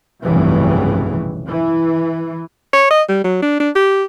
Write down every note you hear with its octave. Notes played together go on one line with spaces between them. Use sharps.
F1 B1 G2 C#3 E3
E3
C#5
D#5
G3
F#3
D4
D4
G4